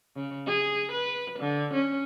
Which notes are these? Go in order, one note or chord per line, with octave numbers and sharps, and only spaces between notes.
C#3
G#4
B4
D3
C#4